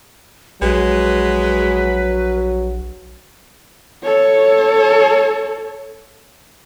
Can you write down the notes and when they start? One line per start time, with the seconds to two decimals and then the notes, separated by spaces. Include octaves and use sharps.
0.61 A#1 F#3 G#3 B4
4.03 A4 C#5